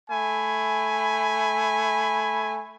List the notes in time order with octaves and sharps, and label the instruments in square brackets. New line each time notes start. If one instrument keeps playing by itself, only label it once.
[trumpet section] A3 G#5 B5